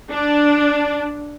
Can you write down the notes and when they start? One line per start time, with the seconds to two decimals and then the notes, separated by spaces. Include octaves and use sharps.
0.11 D4